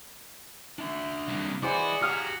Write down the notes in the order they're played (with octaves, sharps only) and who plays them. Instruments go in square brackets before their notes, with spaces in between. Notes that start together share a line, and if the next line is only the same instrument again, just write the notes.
[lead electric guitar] D4 E5
[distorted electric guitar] C2 A#3
[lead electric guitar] E4 B4 [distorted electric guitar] F#4 [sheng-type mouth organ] G#4 D5 D#5 [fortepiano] C5 D6
[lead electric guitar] G4 G#4 [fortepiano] F5 D#6 F6 [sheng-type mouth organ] A#5